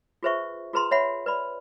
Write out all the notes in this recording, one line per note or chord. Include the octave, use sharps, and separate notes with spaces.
F4 G#4 B4 C5 E5 C#6
F4 G#4 B4 A#5 C6
C#5 E5 F#5 B5
B4 D5 B5